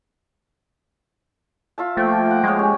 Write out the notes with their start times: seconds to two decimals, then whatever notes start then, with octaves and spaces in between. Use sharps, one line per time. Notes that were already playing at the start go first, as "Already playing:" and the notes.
1.78 F4 E5 A5
1.97 F3 A3 A#3 G5
2.31 F#5
2.44 G#3 C#5 C#6
2.59 C#4 G4